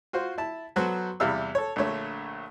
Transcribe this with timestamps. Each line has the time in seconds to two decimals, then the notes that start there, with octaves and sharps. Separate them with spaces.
0.13 F4 F#4 C5
0.38 E4 A5
0.76 F#3 B3 F#4 A4 C5
1.20 E2 C3 G3 E4 F5 E6
1.55 A4 C#5
1.76 A#1 D3 A3 C#5